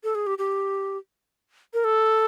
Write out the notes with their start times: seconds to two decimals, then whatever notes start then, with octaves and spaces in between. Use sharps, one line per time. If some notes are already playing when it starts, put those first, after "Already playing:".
0.04 A4
0.15 G#4
0.27 G4
0.38 G4
1.74 A#4
1.84 A4